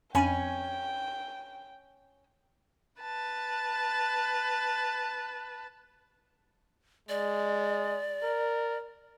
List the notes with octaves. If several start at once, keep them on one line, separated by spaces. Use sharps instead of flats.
F2 C#4 G5 G#5 B5
B4 A5
G#3 D5
A#4